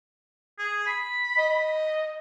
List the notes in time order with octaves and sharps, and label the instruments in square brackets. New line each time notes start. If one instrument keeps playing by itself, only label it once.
[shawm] G#4
B5
[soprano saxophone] D#5